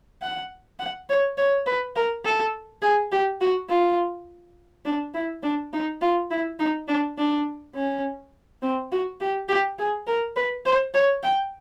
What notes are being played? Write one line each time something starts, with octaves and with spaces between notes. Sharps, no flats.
F#5
F#5
C#5
C#5
B4
A#4
A4
G#4
G4
F#4
F4
D4
E4
D4
D#4
F4
E4
D#4
D4
D4
C#4
C4
F#4
G4
G4
G#4
A#4
B4
C5
C#5
G5